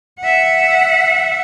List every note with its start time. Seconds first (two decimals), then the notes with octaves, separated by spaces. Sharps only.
0.20 E5 F#5